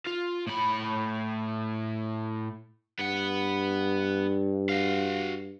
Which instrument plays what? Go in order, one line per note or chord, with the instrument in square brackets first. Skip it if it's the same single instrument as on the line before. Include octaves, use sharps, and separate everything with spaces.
[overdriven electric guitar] F4
A2 B5
[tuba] G2 [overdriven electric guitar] B3 F#5
[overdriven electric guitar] F#4 F5